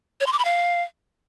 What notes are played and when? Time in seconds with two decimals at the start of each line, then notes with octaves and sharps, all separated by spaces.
0.20 C#5
0.27 C6
0.33 D6
0.39 B5
0.45 F5